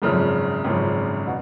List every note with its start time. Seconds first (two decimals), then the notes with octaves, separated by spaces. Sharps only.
0.02 G#1 F#2 C#3 F3
0.64 G#1 F#2 C#3 F3
1.26 B2